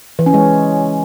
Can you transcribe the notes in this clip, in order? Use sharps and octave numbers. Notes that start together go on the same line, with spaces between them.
E3
C#4
G#3